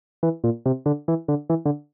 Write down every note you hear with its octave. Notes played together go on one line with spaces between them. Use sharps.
E3
A#2
C3
D3
E3
D3
E3
D3